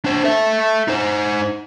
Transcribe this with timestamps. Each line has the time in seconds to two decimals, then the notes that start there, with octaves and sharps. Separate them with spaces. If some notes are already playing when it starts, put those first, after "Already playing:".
0.05 D4 C5
0.24 A4 E5
0.88 D#4 C5